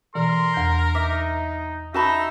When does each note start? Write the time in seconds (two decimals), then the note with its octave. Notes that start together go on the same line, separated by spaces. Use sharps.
0.15 B2 E3 A#4 C6
0.54 E2 G6
0.95 D#4 E5 D6
1.94 D#4 F#4 E5 A5 B5